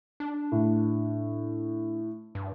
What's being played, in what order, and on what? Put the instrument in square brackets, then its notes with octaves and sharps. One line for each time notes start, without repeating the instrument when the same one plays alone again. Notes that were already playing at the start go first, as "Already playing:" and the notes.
[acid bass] D4
[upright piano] A2
[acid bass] G2